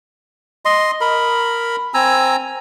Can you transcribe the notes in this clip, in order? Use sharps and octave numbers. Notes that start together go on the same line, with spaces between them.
D#5 C6
A#4 B5
C4 G#5 A#5 E6